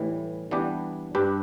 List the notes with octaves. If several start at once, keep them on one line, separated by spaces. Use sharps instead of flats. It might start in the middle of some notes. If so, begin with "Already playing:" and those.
Already playing: A2 E3 G3
E3 G3 B3 D4 G4
G2 G3 D4 G4 B4